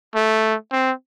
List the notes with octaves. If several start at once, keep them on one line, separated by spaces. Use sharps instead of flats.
A3
C4